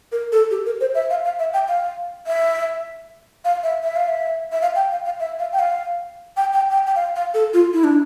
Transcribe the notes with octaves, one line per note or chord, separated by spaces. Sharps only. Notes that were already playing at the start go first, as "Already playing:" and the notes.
A#4
A4
G4
A#4
C5
E5
F5
F5
E5
G5
F5
E5
F5
E5
E5
F5
E5
E5
F5
G5
F5
F5
E5
F5
G5
F5
G5
G5
G5
G5
F5
F5
A4
F4
E4
D4